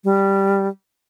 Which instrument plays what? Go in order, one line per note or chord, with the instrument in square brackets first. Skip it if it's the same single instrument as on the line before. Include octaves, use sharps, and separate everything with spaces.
[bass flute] G3